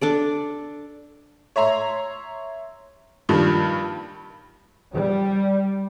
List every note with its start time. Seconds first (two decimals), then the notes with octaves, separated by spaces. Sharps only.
0.01 D4 A4 D5
1.56 C#5 E5 A#5 C6
3.29 G2 A#2 D#3 F3 G3
4.94 G3